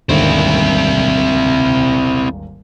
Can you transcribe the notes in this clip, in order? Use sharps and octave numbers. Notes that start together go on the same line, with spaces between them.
D#1 G#1 D3 C4 E4